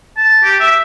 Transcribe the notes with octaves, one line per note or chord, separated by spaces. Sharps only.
A5
G4
E5